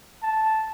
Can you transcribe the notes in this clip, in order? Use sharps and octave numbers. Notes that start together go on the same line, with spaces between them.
A5